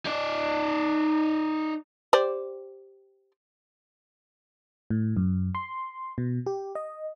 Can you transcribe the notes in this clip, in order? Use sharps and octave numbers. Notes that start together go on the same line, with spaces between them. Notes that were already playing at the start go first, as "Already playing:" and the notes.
D#4 D5
G4 C5 D5
A2
F#2
C6
B2
G4
D#5